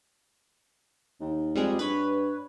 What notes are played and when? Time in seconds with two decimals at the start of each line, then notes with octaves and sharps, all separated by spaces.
1.20 D#2
1.55 F2 G3 G#3 G#4
1.79 G2 B4 C#5